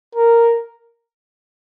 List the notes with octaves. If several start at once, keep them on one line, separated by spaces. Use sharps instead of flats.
A#4